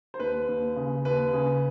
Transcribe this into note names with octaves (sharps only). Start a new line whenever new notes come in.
C5
D#2 B4
D#2
C#3
D#2 B4
C#3